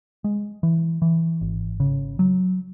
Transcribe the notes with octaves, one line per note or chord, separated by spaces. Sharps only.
G#3
E3
E3
G#1
C#3
F#3